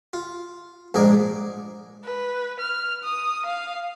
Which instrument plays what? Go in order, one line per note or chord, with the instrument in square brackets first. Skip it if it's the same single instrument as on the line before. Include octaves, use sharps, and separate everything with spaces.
[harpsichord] F4
A#1 G#2 G#4 A#4 D5
[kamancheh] B4
F6
D#6
F5